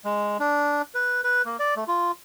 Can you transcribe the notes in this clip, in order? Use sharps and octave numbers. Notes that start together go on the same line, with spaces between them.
G#3
D4
B4
B4
A#3
D5
A3
F4